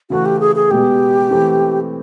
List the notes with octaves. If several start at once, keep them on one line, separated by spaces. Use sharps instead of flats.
C#3 E3 A3 C#4 F#4
G4
G#4
G#4
B2 G#3 B3 G4
E3 A3 C4